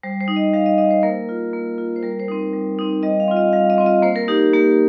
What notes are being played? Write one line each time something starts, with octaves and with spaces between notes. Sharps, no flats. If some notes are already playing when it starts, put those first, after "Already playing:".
G3 C5
C5
D#4
D#5
G3 F5
D#5
D#4 D#5
C5
A#3 A#4
F4
A#3
F4
C5
G3 A#4
C5
C4 D#4
G3
C4 D#4
G3 D#5
F5
C4 F4
D#5
G3 F5
D#5
C4 F4
D#5
A#3 C5
A#4
D#4 G4
A#3 G4